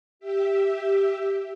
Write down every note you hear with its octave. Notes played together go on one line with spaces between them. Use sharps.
G4 E5